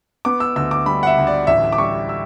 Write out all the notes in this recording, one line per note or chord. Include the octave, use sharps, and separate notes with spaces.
B3 D6
E6
D2 E6
D6
G3 B5
F#5
E5
D2
D5
A1 E5
D6
G3 C#6
E6